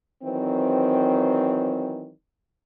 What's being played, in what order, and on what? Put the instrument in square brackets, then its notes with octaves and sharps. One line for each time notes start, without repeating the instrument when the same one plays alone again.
[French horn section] D#3 E3 F#3 C4